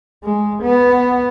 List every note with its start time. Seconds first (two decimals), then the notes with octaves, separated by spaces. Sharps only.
0.24 G#3
0.62 B3